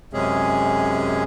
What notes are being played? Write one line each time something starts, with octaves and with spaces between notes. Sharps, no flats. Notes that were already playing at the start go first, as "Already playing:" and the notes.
F#2 C3 G#3 C#4 G#4